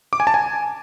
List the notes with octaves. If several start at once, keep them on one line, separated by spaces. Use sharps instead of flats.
D6
G#5
A5
G#5